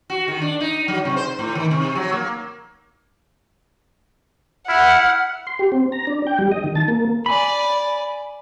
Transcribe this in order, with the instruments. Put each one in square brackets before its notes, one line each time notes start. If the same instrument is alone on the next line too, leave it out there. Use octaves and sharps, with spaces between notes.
[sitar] F#4
D#3
D4
D#4
F#3
C3
C5
A2
D#3
C3
F#3
A#3
[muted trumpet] E4 [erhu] F#5 [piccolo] F6
[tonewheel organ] C6
G4
C4
A#5
D4
G5
G3
D#5
D#3
A5
A#3
[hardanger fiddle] D5 G#5 [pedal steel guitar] B5